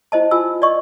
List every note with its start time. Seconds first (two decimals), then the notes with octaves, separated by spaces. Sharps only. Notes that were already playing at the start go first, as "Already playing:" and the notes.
0.12 E4 C5 D#5 A5
0.31 F4 G#5 E6
0.62 D5 D#5 C#6